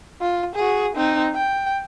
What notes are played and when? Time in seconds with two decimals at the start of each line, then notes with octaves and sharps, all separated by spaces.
0.21 F4
0.56 F#4 G#4
0.96 C4 D#4
1.35 G5